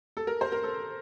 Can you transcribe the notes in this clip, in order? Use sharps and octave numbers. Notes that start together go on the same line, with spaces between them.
A4
A#4
C5
A#4
A4